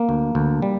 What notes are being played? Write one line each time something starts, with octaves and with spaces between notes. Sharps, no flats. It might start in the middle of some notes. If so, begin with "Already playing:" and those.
Already playing: A#3
D2
D2
G3